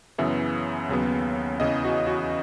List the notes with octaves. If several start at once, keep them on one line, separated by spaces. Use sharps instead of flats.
F#2 C#3 E3 B3 E5
D#2 C#3 F#3 B3
E2 C#3 E3 D#5
F#4
F#4